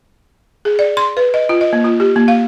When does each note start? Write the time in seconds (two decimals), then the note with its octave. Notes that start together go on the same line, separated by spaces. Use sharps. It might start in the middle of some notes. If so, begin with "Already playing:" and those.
0.65 G#4
0.79 D5
0.97 C6
1.17 B4
1.34 D#5
1.49 F4
1.61 D#5
1.73 A#3
1.84 F4
2.00 G4
2.16 A#3
2.28 F5